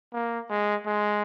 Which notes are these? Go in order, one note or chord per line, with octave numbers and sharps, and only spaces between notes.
A#3
G#3
G#3